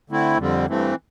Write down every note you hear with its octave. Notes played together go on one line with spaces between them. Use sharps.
D3 A3 C4 E4
F2 D3 G3 C4
G2 E3 A3 C4